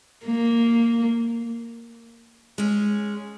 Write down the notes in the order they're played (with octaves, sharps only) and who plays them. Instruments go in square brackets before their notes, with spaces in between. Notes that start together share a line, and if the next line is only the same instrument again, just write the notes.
[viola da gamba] A#3
[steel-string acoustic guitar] G#3 C#4